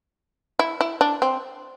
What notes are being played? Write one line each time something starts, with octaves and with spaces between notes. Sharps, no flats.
E4
E4
D4
C4